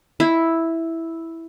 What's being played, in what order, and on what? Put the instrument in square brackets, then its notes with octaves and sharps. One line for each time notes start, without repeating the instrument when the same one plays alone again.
[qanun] E4